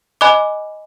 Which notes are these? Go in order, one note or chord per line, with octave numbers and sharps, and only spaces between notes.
D#5 G#5 B5 D6 F#6